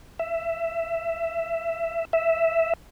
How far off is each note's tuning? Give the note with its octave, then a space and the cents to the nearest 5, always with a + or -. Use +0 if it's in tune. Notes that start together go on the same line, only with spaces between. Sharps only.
E5 +15
E5 +0